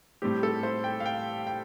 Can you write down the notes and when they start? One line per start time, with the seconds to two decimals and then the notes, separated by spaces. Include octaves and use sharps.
0.22 A2 G3 C4 G4
0.43 A4
0.63 C5
0.84 G5
1.00 F5
1.06 G5
1.47 G5